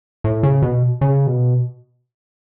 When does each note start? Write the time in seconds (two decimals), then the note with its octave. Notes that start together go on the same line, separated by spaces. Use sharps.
0.24 A2
0.43 C#3
0.62 B2
1.01 C#3
1.27 B2